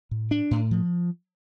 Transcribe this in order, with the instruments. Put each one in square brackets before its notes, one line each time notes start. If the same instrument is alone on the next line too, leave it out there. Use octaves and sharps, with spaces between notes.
[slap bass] A2
D4
A2
F3